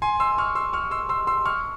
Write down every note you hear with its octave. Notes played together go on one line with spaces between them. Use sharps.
G#5 C6
C6 E6
C#6 F6
C6 E6
C#6 F6
C6 E6
C6 E6
C6 E6
C#6 F6